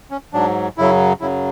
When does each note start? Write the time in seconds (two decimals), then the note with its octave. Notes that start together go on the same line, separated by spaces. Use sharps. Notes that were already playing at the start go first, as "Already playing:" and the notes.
0.11 C#4
0.33 G#2 F#3 D4
0.78 F#2 C#3 F#3 E4
1.21 F#2 C#3 F#3 E4